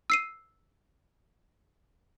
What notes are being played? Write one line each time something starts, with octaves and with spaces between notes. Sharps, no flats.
E6 C7 D#7